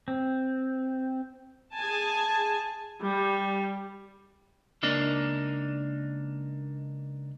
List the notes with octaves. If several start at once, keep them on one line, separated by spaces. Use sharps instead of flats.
C4
G#4 G#5 A5
G3
C#2 A#3 D4 D#4